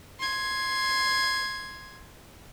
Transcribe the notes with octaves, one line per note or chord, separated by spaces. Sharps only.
C6 G#6